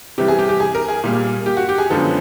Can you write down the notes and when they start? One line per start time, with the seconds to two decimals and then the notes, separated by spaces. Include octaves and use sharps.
0.18 C3 E3 G3 G4
0.28 G#4
0.39 G4
0.49 G4
0.60 G#4
0.75 A#4
0.89 G#4
1.04 A#2 G3 A#3
1.46 G4
1.57 F#4
1.69 G4
1.78 G#4
1.90 F#2 D3 F3 G#3 B3 A4